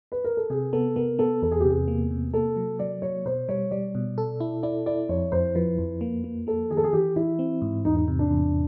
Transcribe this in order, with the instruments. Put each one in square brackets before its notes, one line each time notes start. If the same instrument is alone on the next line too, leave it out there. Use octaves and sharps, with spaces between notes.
[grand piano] B4
A#4
A4
[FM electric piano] C3 [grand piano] G#4
[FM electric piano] B3 [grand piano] A4
[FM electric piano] B3 [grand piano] A#4
[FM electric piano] B3 [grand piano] A4
[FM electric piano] E2 [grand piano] A4
[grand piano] G#4
G4
[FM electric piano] C3 [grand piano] G#4
[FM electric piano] A#3
C3
[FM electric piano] A#3 [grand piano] A4
[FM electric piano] F#3
[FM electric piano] F#3 [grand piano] D5
[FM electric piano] F#3 [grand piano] C#5
[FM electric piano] B2 [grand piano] C5
[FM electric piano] G3 [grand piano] C#5
[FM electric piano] G3 [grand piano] D5
[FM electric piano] B2
A4
E4
[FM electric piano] E4 [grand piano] D5
[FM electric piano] E4 [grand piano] D5
[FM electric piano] F2 [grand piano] C#5
[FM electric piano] F2 [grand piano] C5
[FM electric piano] F3 [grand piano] B4
[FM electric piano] F2
A#3
A#3
[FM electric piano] A#3 [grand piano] A4
[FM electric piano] D#3 [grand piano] G#4
[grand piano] A4
G#4
[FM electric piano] E3 [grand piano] G4
[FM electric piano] E3 [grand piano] E4
[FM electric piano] C4
G#2
[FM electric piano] E2 [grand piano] D#4
[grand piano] D#4
[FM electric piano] C3
[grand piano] D4
[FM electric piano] E2